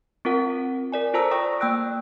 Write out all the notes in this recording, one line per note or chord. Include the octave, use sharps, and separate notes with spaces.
C4 F4 A#4 F#5
A#4 D5 G#5
F4 A4 C5 A5 A#5 E6
D5 G5 C#6 D#6 A#6
A#3 G5 E6 F#6 D7